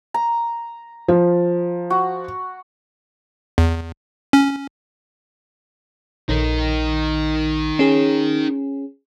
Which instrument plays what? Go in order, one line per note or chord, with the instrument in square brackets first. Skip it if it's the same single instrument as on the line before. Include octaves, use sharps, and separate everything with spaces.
[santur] A#5
[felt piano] F3
[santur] F#4
[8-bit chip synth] E2
C#4
[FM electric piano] A#1 [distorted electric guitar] D#4 A#4
[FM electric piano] C#4 G#4